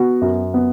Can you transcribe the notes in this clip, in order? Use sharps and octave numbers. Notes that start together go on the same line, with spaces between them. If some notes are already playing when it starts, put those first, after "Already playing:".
Already playing: B3 F#4
F#2
B3